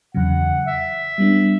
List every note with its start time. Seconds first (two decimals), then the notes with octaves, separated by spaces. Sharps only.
0.14 E2 C#3 F#3 F#5
0.66 E5
1.18 G3 B3 D4